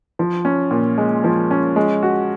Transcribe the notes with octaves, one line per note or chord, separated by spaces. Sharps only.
F3
C#4
A#2
G#3
F3
C#4
G#3
F#4